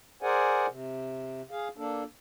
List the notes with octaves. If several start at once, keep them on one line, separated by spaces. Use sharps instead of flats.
G#4 A#4 C5 D5 F#5 G#5
C3
G#4 F5
A#3 D4 A4